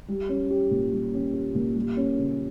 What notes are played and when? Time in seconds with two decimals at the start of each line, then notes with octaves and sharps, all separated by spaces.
0.08 G3
0.29 C#4
0.50 G4
0.71 A#2
0.92 G3
1.14 C#4
1.34 G4
1.55 A#2
1.75 G3
1.97 C#4
2.18 C#3